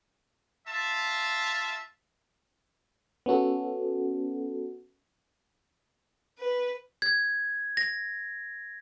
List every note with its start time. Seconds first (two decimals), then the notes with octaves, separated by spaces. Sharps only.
0.67 F4 E5 A5
3.26 B3 C#4 F#4 A4
6.37 B4
7.02 G#6
7.77 A#6